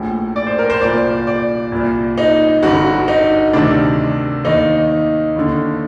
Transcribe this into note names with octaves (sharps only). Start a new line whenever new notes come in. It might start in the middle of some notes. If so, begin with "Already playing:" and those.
Already playing: A#1 A2
D5
C5
A#4
C5
C2 A#2 D5
D5
C2 A#2
D#4
G1 G2 D3 F#4
D#4
D2 C3 D#3 D4
D#2 D#3 D#4
D#2 D3